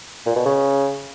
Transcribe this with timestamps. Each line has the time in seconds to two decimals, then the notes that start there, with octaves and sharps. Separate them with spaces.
0.26 A#2
0.36 B2
0.45 C#3